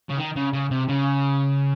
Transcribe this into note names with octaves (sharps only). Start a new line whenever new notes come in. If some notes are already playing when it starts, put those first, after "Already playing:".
C#3
D#3
C#3
C#3
C3
C#3